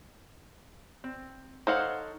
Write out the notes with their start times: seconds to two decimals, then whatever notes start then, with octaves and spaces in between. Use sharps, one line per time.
1.04 C4
1.67 D#4 A4 C5 C#5 F5 F#5